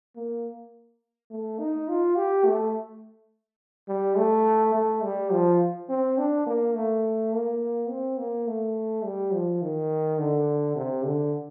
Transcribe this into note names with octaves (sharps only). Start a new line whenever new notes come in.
A#3
A3
D#4
F4
G4
A3
G3
A3
A3
G3
F3
C4
D4
A#3
A3
A#3
C4
A#3
A3
G3
F3
D#3
D3
C3
D3